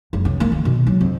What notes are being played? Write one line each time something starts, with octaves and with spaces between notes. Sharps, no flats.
F#1
C#2
A#3
D#3
B2
F#3
F2